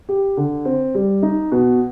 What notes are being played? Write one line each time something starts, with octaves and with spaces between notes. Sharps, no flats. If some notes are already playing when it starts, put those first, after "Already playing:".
G4
D3
C4
G3
D#4
B2